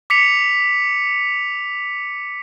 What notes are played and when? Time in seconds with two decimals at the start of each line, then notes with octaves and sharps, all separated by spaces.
0.10 D6 B6 C#7 F7